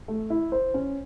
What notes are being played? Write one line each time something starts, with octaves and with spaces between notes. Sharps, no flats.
A3
E4
C5
C#4